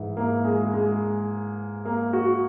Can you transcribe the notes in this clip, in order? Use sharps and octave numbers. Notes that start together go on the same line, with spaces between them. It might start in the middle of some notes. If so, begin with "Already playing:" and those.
Already playing: G#2 E3
A#3
G#3
G#3
A#3
F#4